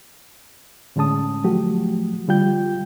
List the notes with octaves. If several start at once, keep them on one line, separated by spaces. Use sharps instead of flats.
A2 D3 G#3 C#4 A5 D#6
F3 F#3 A3 F#4 G4
D3 G3 F4 G5 G6